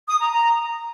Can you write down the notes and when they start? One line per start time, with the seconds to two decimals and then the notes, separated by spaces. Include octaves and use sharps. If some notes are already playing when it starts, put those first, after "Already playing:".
0.09 D#6
0.20 A#5
0.32 A#5